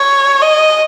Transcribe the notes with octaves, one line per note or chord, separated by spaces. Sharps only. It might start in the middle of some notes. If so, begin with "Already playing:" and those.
Already playing: C#5
D#5